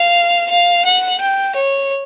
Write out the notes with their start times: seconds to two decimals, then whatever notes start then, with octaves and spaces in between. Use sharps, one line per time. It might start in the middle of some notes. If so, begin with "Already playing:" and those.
Already playing: F5
0.50 F5
0.85 F#5
1.21 G5
1.55 C#5